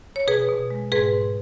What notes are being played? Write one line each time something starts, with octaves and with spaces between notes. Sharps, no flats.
C#5
B2 G#4 B4
B2
G#3
G#2 G#4 B4
G#2